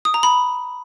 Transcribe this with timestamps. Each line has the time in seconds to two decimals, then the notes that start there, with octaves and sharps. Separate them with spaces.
0.05 D#6
0.14 A#5
0.23 B5